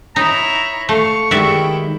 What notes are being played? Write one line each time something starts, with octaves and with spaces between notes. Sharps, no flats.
D#4 E4 C#5 A#5
A3 F5 C#6
D#3 G#3 E4 F#4 G4 D5 E5 G5